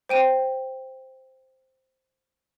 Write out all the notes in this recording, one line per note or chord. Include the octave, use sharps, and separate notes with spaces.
C5 G5 D#7